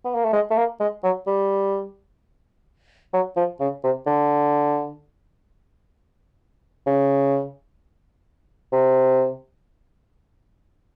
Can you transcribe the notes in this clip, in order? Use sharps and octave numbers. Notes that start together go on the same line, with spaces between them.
B3
A#3
A3
G#3
A3
A#3
G#3
F#3
G3
F#3
F3
C#3
C3
D3
C#3
C3